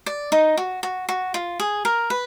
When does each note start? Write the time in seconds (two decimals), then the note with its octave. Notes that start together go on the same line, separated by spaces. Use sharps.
0.06 D5
0.32 D#4
0.57 F#4
0.83 F#4
1.09 F#4
1.34 F4
1.60 G#4
1.85 A#4
2.10 B4